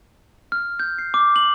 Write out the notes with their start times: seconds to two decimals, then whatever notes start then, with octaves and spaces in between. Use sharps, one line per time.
0.52 F6
0.79 G6
0.98 C7
1.14 D6
1.36 F#7